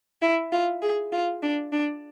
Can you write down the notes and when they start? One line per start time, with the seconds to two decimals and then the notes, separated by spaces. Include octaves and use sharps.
0.22 E4
0.52 F4
0.82 G#4
1.12 F4
1.42 D4
1.73 D4